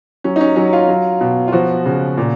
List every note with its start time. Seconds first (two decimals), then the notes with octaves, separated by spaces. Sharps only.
0.24 F#3 C#4
0.36 D#4
0.41 C#4
0.56 F#3 C#4
0.73 F4
0.89 F#3
1.21 B2
1.48 F4
1.52 F3 F#4
1.86 C#3
2.17 A#2